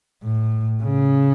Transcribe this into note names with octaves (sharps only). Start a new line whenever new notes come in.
A2
C#3